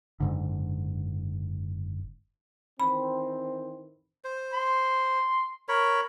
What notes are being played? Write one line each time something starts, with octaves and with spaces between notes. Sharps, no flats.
F#1 G#2 D3
D#3 E3 C4 B5
C5
C6
A#4 C#5 B5